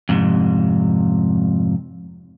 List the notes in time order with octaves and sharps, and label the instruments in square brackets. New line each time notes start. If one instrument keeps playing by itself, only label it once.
[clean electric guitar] F2 G#2 C3